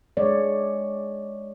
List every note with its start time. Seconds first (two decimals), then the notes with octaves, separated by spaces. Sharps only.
0.17 G#3 C#5 D5